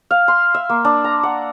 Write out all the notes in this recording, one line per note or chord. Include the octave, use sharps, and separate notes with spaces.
F5
C6
E5
A#3
D4
A#5
F#5